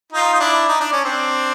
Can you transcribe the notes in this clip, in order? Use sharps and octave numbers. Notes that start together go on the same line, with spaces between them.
D#4 F4
D#4
D4 E4
D#4
D4
C#4
C4 D4